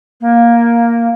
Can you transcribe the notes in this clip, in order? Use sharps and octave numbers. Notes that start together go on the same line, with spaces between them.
A#3